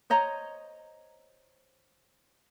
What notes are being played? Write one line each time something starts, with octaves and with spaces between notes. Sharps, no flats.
C5 C#5 D#5 A#5